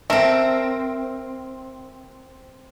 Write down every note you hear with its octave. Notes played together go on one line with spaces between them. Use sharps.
C4 A4 A#4 E5